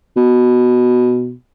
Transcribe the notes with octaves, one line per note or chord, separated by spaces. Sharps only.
B2